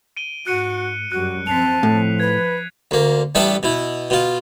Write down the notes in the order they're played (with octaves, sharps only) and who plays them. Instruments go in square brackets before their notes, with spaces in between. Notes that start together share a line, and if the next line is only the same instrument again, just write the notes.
[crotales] D7 D#7 G7
[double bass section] G#2 [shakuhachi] F#4 [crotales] F#6 C#7 D#7
[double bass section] F#2 G3 [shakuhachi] F#4 [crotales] F#6
[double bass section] F3 C4 [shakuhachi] A5 [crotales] B6 C7 F7
[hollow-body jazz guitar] A2 [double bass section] F3
[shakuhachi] B4 [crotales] G#6
[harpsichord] D2 A#3
A1 G3 B3 D4 E5 A5
B2 E4
B2 F4